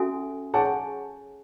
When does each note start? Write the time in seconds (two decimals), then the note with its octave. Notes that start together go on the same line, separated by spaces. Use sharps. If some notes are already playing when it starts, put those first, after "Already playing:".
Already playing: C#4 F#4 A4 E5 G#5
0.54 G#4 C#5 F#5 G#5 A5 C#6